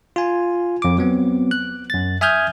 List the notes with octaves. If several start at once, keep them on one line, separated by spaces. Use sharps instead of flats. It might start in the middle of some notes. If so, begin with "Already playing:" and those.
F4 G#5
F2 D6
F#3 B3 C4
F#6
F#2 A6
E5 G#5 D#6 F6 G6 G#6